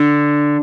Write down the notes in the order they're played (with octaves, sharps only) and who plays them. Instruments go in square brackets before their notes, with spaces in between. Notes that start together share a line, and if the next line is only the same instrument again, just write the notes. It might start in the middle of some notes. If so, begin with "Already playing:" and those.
Already playing: [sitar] D3